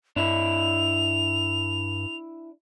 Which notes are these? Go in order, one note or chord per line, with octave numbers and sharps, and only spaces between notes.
G2 D4 E4 F7